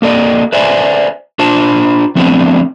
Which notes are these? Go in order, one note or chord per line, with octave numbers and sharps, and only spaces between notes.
A#3 A4 D5 D#5
B4 C5 D5 E5 G#5
D4 F4 C5 A5
F3 A3 B3 C4 D4